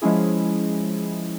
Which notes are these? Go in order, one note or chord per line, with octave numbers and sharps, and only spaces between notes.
F3 G#3 C#4 E4 G#4